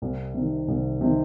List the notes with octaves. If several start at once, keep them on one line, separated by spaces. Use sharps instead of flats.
C2
C3 D#3
C2
C3 D#3